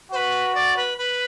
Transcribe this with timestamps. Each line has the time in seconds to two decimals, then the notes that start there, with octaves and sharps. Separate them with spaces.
0.12 F#4 B4 C5
0.54 D5
0.76 B4
0.97 B4